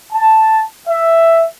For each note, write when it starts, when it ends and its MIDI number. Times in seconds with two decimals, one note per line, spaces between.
0.13 0.62 81
0.87 1.45 76